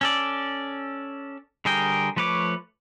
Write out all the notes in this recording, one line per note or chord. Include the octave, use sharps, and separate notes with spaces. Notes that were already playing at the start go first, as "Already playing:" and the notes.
C#4 A4 D5
D3 G3 G#4 A#4 G5
F3 A3 B4 C#5 D6